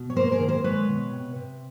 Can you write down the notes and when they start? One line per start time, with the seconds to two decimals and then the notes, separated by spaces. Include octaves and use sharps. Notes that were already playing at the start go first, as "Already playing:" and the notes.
Already playing: B2
0.10 C#5
0.16 A#3 A#4 C5
0.32 G#4 A#4
0.40 D#3
0.48 A#4 C5
0.64 G#3 B4 C#5
0.88 B2
1.12 C3
1.36 C3